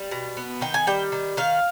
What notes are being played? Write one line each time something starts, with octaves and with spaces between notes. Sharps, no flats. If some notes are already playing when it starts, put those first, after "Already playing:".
Already playing: G3
B2
B3
D#3 G5
G#5
G3 G5
D#3
D#3 F5